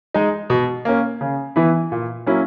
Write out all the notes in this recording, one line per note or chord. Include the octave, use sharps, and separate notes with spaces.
G#3 D#4
B2
A#3 C#4
C#3
E3 B3 E4
A#2
F#3 A#3 C#4 E4